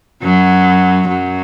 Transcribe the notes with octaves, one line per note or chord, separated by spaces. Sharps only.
F#2 F#3
F#2 F#3